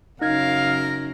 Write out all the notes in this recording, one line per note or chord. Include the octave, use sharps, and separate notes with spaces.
F#2 C#3 D#4 A#4 F5 G#6